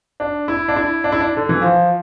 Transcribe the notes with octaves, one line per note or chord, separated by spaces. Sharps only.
D4
E4
D4
E4
D4
E4
D4
D3
E3
F3